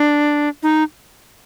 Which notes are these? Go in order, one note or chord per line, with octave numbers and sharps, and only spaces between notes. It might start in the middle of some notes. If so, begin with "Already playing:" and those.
Already playing: D4
D#4